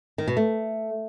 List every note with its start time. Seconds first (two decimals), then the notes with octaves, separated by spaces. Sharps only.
0.18 D#3
0.27 B2
0.37 A3